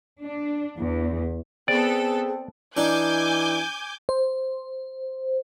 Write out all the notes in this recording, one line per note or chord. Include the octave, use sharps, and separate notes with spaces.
D4
E2
B3 C4 G#4 A4 D5
E3 D4 D#4 G#5 D6 G6
C5